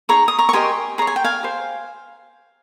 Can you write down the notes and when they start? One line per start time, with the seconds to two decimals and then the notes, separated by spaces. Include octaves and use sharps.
0.09 D#4 G#4 C#5 A#5 C#6
0.28 D#6
0.39 A#5 C#6
0.49 C#6
0.53 G4 A#4 D#5 G#5 C6
0.98 G#4 C#5 A#5
1.07 G#5
1.16 G5
1.24 F5 G#5
1.43 G4 C5